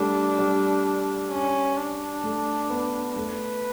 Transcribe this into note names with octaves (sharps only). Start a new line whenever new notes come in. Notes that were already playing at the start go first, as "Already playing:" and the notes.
Already playing: G3 A3 D4
G3
C#4
D4
A3
B3
A3 B4